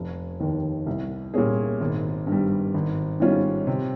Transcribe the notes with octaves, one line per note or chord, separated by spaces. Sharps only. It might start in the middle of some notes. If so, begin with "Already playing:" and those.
Already playing: F1
D#2 D#3
C2
A#2 G3 C#4 G#4
G#1
G2
G3
G#1
G#2 G3 C#4 F4
C3